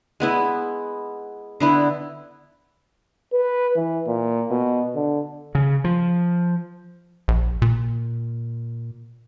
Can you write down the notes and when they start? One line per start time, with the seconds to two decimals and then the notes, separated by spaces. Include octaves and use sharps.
0.20 G#3 B3 E4
1.60 D3 B3 E4
3.33 B4
3.76 E3
4.07 A#2
4.51 B2
4.95 D3
5.55 C#3
5.84 F3
7.28 A#1
7.62 A#2